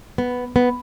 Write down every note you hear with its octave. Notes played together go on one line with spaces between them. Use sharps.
B3
B3